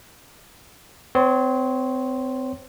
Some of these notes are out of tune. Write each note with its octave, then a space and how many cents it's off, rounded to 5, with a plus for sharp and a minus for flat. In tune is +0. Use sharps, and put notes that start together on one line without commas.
C4 -30 C#5 +0 C6 +0